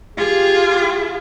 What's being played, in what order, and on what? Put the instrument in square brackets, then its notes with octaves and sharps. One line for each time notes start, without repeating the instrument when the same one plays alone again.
[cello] F4 G#4 [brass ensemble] G4